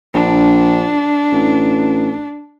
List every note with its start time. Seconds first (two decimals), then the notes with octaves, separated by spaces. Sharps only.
0.14 A#1 D4
1.32 A1